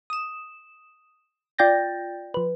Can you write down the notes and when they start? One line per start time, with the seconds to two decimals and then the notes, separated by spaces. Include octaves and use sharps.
0.10 D#6 E7
1.59 F4 D5 G5 G6 A6 A#6
2.34 F3 B4